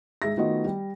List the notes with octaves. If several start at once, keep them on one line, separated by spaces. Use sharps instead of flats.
G#2 G#4 E5 A#6
D#3 A3 B3 F4 F#4 D#5
G3